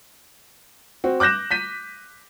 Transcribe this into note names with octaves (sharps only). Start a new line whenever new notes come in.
C4 F#4
D6 F#6 G6 A#6 E7
G6 B6 D#7